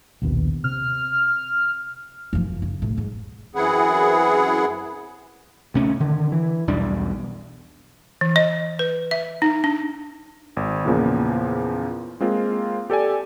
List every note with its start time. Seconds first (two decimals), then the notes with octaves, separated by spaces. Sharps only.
0.22 A#1 D#2 B2
0.64 C3 F6
2.33 F#2 F3
2.62 C#3
2.82 C2 A2
2.97 G#2
3.55 F#2 E3 C4 E4 G#4 F#5
5.74 D2 C3 A3 C#4
6.00 D3 D#3
6.32 E3
6.67 B1 E2 G3 D4
8.21 E3
8.36 D#5
8.79 B4
9.11 E5
9.42 D#4
9.64 D4
10.57 G#1
10.85 E2 A#2 C#3 F3 A#3
12.20 G#3 A#3 C4 F4
12.90 G4 A4 D5 G#5